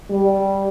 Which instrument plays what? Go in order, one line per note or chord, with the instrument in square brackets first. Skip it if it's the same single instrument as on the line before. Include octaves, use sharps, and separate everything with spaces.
[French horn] G3